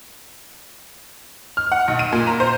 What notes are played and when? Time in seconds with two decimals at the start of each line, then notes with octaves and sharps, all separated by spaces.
1.57 F6
1.72 F#5
1.88 B1
1.99 D#7
2.12 A#2
2.27 A#5
2.40 C5